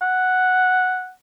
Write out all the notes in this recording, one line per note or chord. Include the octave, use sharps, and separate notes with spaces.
F#5